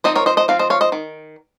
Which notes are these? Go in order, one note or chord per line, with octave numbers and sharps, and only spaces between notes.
F3 C4 D#4 C5 D#5
A#4 C#5
C5 D#5
C5 D#5
F3 C4 F5
C5 D#5
C#5 F5
C5 D#5
D#3